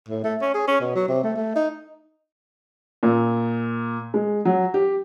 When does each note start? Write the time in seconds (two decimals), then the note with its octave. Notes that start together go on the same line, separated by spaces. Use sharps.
0.08 A2
0.24 A3
0.41 C#4
0.54 G#4
0.68 C#4
0.80 B2
0.95 F#3
1.08 C3
1.24 A3
1.36 A3
1.55 D#4
3.03 A#2
4.14 G#3
4.45 F#3
4.74 G4